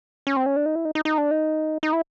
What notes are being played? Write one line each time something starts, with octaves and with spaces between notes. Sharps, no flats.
C#4
C4
C#4
D4
D#4
E4
D#4
D#4
D#4
D4
D#4
D#4
E4